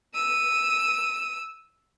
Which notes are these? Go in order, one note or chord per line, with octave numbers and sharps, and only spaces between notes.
E6 D#7